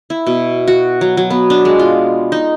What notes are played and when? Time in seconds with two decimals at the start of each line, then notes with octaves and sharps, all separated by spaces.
0.10 E4
0.27 B2
0.68 F#4
1.01 F#3
1.17 F#3
1.30 B3
1.50 D4
1.65 G#3
1.79 F4
2.32 D#4